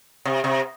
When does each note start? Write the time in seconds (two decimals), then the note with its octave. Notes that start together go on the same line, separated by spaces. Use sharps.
0.25 C3
0.44 C3